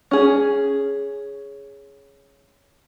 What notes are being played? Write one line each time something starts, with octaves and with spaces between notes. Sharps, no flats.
C#4 G#4